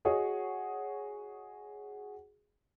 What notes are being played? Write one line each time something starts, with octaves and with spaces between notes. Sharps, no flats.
F#4 G#4 C#5 D#5